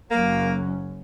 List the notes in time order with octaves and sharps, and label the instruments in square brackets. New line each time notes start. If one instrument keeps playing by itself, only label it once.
[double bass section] F#1 F#2 F#3 C#4 [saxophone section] A#3